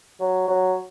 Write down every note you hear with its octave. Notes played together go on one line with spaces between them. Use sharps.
F#3
F#3